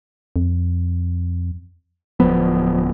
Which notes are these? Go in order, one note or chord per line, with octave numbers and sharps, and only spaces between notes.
F2
D1 F3 B3